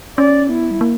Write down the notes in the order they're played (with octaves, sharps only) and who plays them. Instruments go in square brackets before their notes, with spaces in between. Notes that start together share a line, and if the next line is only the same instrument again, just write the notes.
[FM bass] C#4 [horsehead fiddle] D5
[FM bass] B3 [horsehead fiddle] E4
[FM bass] G3
A#3